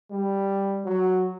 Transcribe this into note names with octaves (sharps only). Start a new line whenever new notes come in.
G3
F#3